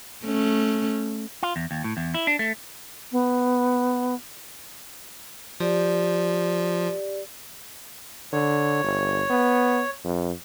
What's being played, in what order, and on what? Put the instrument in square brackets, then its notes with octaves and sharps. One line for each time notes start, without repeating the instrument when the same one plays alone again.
[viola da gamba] A3 C#4
[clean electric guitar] F4
E2
D#2
A2
E2
E4
D4
A3
[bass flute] B3
[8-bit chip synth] F3 [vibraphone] G4 D5
[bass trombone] D3 [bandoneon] C#5
[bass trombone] G1
B3
F2